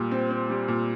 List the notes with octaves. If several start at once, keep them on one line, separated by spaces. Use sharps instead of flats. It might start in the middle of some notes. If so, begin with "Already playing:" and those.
Already playing: A#2 G3
C4
C4
G3
A#2